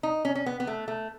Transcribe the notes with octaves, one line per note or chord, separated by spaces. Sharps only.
D#4
C#4
C#4
B3
B3
A3
A3